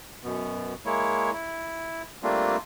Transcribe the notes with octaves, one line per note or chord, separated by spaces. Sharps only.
F#2 B2 B3
G#3 A#3 E4 C#5
E4
G3 A3 A#3 C4 D4 F4